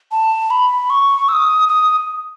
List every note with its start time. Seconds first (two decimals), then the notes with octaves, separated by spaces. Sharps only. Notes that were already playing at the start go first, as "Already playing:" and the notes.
0.12 A5
0.50 B5
0.90 C#6
1.28 E6
1.33 D#6
1.69 D#6